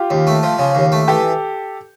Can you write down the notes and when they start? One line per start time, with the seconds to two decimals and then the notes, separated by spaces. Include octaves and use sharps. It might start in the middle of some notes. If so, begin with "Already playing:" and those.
Already playing: F4 G4
0.10 D#2
0.27 A3
0.43 F3
0.59 C#3
0.75 D#2
0.92 A3
1.08 E3 G4 A4